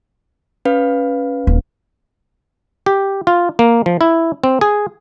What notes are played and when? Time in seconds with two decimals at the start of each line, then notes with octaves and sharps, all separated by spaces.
0.65 C#4 B4 F5
1.47 D#1
2.86 G4
3.27 F4
3.59 A#3
3.86 F3
4.01 E4
4.44 C4
4.61 G#4